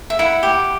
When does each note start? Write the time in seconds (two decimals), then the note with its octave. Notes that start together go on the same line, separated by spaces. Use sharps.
0.10 E5
0.19 E4 F#5
0.43 G4